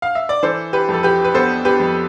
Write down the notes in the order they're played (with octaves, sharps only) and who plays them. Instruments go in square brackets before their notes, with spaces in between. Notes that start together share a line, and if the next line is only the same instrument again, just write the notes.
[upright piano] F5
E5
D5
E3 A4 C5
G4 B4
F2 A4
G4 B4
B4
B3 A4 C5
G4 B4
F2